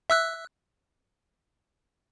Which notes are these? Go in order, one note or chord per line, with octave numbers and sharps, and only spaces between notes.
E5 E6 F#6